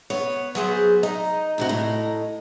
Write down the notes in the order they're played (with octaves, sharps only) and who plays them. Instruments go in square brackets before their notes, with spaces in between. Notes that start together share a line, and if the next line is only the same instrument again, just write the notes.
[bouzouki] B3 [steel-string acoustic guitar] C#5
[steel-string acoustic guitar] F#3 [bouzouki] B3 G#4 C5
[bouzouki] D#4 [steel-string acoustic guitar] D#5
[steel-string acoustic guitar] D2 C3 F#4
A2 D#5